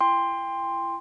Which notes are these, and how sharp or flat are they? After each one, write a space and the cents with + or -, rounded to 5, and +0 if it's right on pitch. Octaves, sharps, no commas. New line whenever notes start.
E4 +40 G5 +30 C6 +0